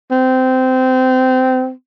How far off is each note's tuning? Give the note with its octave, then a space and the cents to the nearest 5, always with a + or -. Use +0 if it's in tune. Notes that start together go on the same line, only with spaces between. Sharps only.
C4 -20